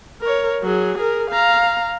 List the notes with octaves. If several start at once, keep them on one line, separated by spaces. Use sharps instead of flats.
A#4 C#5
F#3 G#4
G#4 A#4
F5 A#5